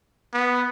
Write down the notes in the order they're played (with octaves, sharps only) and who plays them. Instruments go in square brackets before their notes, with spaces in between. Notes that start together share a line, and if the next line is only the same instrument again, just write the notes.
[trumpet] B3